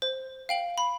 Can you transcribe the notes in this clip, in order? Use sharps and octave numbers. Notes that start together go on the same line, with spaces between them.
C5
F5 G5 F#7
B5